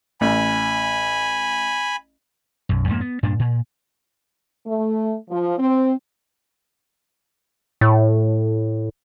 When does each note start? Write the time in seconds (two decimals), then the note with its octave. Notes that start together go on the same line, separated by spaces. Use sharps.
0.21 A1 G#5 B5
2.69 B1 F#2
2.88 F2 G#2 A3 A#3
3.01 B3
3.23 G2 A#2 D4
3.40 A#2
4.66 A3
5.29 F3
5.58 C4
7.81 A2